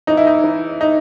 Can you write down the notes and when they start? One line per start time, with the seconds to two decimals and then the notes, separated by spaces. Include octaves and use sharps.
0.07 E3 D#4
0.17 E4
0.27 D#4
0.44 E3
0.81 D#4